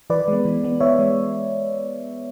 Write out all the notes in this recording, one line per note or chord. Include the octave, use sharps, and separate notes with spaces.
E3 B4 D5
G#3 B3
E3
G#3 B3
E3 C#5 E5
G#3